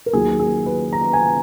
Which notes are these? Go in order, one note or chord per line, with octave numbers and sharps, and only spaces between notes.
A#4
D#2 D#3 F#3 G#4
G#4
B4
A#5
G#5